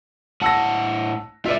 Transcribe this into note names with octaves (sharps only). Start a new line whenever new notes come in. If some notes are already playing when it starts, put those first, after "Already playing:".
A2 F#5 A5 E6 A#6
F4 B4 D5 E5